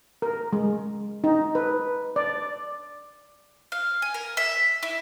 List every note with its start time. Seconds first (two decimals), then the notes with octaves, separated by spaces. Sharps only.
0.22 A#4
0.53 G#3
1.24 D#4
1.55 B4
2.16 D5
3.72 F5
4.02 G#5
4.14 A#4
4.37 E5
4.83 E4